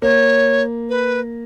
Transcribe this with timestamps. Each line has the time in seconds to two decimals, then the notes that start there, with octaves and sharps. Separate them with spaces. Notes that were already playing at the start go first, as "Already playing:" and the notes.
0.02 A#3 C#5
0.90 B4